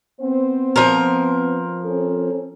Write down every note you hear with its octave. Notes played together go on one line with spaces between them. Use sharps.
B3 C4 C5
F3 A#4
C4 C#4 A4